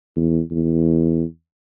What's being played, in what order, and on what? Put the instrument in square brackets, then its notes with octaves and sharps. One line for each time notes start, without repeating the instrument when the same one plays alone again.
[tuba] E2
E2